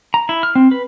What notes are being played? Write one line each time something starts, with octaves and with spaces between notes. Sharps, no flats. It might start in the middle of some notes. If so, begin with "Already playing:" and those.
A#5
E4
F6
C4
B4